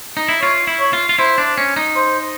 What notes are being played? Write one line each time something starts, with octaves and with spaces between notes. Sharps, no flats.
D#4
E4
F4 C#5
E4
C#5
F4
F4
E4 C5
D4
C#4
D#4
C5